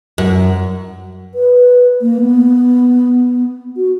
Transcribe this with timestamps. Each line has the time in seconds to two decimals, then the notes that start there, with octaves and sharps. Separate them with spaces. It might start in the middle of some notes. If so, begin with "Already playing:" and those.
0.18 F#2
1.34 B4
2.02 A#3
2.21 B3
3.77 F#4